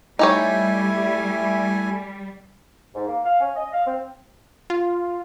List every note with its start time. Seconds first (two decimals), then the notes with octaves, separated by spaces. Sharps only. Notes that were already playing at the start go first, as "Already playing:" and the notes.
0.19 G3 A3 D#4 E4 G4 C#5 G#5
2.95 G#2
3.08 A#3
3.24 F5
3.40 C#4
3.56 D#5
3.73 F5
3.86 C4
4.70 F4